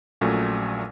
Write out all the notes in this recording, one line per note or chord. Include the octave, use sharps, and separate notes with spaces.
A#1 A#2 F#3 A3 C#4